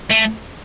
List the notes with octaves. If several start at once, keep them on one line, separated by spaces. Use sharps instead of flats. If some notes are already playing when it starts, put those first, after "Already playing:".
A3